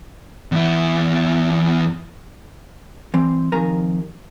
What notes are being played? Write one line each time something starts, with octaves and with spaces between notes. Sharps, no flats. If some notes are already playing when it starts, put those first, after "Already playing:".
E2 E4
E3 G3 C4
C3 D#3 F3 A#4 G#5 A#5